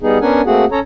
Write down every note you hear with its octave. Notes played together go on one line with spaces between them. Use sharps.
G3 B3 D#4 G#4
B3 C#4 D4 A#4 F#5 G#5
A3 A#3 C4 F#4 G#4 F#5
C#4 A4 C#5 A#5